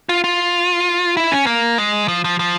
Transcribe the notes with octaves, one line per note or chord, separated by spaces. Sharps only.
F4
F4
E4
C#4
A#3
G#3
F3
F3
F3